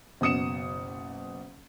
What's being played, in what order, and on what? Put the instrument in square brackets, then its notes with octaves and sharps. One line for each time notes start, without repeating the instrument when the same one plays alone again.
[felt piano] F#1 B2 D#6 C#7 E7